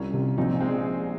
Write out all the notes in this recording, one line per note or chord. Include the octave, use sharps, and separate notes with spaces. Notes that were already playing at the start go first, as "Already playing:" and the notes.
Already playing: C2 C#4 F4
C3
A#1 C4 D#4
G#3 C4